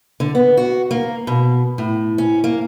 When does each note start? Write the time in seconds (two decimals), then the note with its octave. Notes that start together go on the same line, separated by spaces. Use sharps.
0.20 D3
0.35 B3
0.57 F#4
0.91 A#3
1.27 B2
1.78 A2
2.18 C#4
2.44 A#3